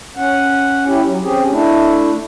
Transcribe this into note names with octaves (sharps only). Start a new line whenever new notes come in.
C#4 F#5
C#4 E4 G4
F#3
C4 C#4 G4 G#4
A3 D4 E4